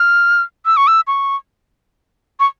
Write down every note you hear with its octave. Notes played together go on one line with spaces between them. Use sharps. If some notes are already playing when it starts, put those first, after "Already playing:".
Already playing: F6
E6
C#6
E6
C#6
C#6